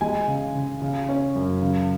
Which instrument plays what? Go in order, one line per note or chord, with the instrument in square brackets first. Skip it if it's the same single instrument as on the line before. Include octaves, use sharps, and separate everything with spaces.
[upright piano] G#3 G#5
C#3
C#3
C#3
C#4
F#2
C#3